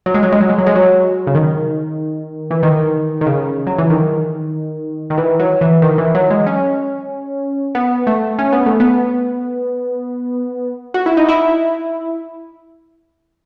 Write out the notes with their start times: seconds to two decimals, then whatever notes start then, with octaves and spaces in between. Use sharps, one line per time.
0.06 F#3
0.14 G#3
0.23 F#3
0.32 G#3
0.41 F#3
0.49 G#3
0.58 F#3
0.67 G#3
0.75 F#3
1.27 C#3
1.35 D#3
2.51 E3
2.63 D#3
3.21 D#3
3.27 C#3
3.67 F#3
3.78 E3
3.90 D#3
5.10 D#3
5.18 E3
5.40 F#3
5.61 E3
5.82 D#3
5.98 E3
6.15 F#3
6.30 G#3
6.46 C#4
7.75 B3
8.07 A3
8.39 C#4
8.53 B3
8.66 A3
8.80 B3
10.94 F#4
11.06 E4
11.17 D#4
11.29 E4